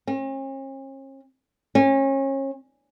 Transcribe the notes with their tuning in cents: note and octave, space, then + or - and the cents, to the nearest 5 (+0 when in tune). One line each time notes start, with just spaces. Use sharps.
C#4 -45
C#4 -30